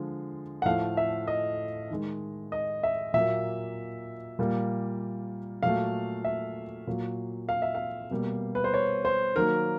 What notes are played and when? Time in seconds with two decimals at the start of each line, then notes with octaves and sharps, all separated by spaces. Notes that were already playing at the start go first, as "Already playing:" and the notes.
Already playing: D3 F3 G#3
0.62 F#5
0.66 A2 F3 A3 F5
0.97 E5
1.28 D#5
1.90 D#3 G#3
2.52 D#5
2.83 E5
3.14 A#2 F#3 A#3 E5
4.39 A#2 G3 A#3
5.63 A#2 F#3 A3 F5
6.25 E5
6.87 A#2 F#3 A#3
7.49 F5
7.62 E5
7.75 F5
8.11 B2 G3 A#3
8.55 B4
8.64 C5
8.74 C#5
9.05 C5
9.36 D#3 F#3 A#3 A#4